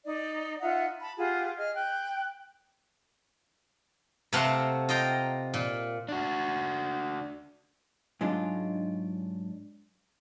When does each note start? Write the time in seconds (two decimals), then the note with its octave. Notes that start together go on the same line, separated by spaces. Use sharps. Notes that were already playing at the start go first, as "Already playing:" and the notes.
0.05 D#4 D5
0.60 D#4 F4 E5 F#5
1.01 A5 B5
1.17 F4 G4 G#4 F#5
1.56 G#4 D#5 F6
1.75 G5 F#6
4.33 C3 A3 F5 F#5 A#5 C6
4.89 F4 D#5 G5 A#5
5.54 A#2
6.09 D4 F#4
8.21 G#2 F#3 G#3 D4 F4